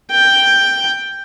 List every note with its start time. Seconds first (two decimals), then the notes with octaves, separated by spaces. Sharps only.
0.11 G5